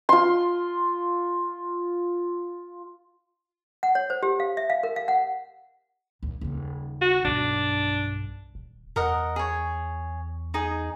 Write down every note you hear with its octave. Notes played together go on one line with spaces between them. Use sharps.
F4 C6
F#5
C#5
C5
G4
F5
E5
F5
A#4
F5
F#5
D#2 A#2
D#1 C#3
F#4
B1 G2 D4
D#1
E2 A#4 D#5 F#5
G#4 C#5
D#4 G#4